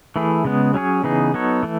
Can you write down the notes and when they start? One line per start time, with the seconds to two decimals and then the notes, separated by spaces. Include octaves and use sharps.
0.16 E3 A3 E4 G#4
0.44 C#3 G#3 B3
0.74 F#3 C#4 G#4 C#5
1.04 C#3 E3 B3 D#4 G#4
1.34 F#3 B3 D#4 A4 C#5
1.63 E3 A3